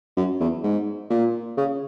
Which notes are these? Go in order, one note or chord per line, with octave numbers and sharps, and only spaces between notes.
F#2
E2
G#2
A#2
C#3